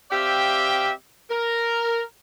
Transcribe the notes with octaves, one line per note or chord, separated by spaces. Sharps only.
C4 G4 D5 E5 F5 G5
A#4